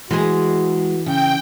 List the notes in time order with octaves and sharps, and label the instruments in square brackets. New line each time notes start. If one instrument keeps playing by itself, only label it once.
[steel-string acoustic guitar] E3 [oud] G#3 G#4 [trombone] F#4
[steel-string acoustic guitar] C#3 [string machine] G5